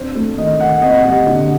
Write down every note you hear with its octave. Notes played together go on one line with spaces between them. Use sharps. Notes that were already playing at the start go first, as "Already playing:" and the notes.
Already playing: C4 D4 C5
A3
D#3 D#5
D#3 F#5
C4 D#5
F#5
G3 D#5
D3